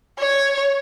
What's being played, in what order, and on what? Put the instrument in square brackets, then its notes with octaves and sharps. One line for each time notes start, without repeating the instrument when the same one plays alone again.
[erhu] C#5